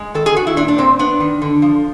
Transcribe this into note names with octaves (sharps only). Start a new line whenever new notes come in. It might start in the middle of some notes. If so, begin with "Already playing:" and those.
Already playing: G#3
D#3 A4
G#4
D#3 F#4
E4
A#2 D4
D4
A#2 C4
B3 D4
D#3
D3
F3